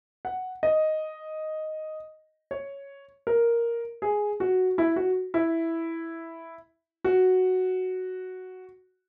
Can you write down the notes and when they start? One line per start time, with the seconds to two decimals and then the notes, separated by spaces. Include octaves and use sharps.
0.25 F#5
0.63 D#5
2.51 C#5
3.27 A#4
4.02 G#4
4.40 F#4
4.78 E4
4.96 F#4
5.34 E4
7.04 F#4